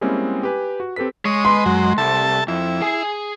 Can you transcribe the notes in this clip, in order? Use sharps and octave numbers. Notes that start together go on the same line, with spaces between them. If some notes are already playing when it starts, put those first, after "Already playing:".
G3 G#3 A#3 C4 C#4 E4
G4 B4 G#5
F#4
C4 G4 A4 B4 B6
G#3 C#5 D#6
B4 D#5 C6
F#2 F#3
C2 A4 E5 A5
F2 E4
G#4 G#5